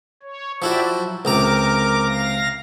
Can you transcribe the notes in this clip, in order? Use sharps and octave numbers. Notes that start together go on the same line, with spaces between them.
C#5
F3 E4 F#4 G4 D5 E5
F#3
C#2 C3 A#4 A#5 D6
F5 A#6